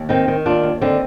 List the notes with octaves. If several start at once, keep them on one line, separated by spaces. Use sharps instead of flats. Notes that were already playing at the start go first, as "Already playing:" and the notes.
Already playing: D#2
D#3 C4 D#4
D#3
D#2 D4 F4
D#2
D3 C4 D#4